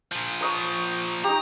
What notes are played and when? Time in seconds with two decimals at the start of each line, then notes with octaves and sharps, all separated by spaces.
0.12 A#2 F3
0.41 C#5 D#5 A#5
1.24 D#4 G4 A#5